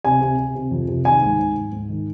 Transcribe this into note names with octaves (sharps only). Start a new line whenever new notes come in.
C3 G#5
C3
C3
C3
F2
C3
D#3 G#5
G#2
G#2
G#2
G#2
D#3